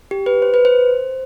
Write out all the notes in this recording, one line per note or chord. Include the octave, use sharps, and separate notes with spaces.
G4
B4
C5
B4
C5